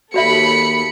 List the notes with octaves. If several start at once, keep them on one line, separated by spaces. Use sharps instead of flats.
D#2 F#4 A4 D5 E5 B5 C#7